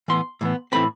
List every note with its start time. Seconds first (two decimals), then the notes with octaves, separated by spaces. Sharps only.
0.08 A2 E3 B3 C6
0.41 A2 E3 B3
0.72 A2 E3 A3 C4 B5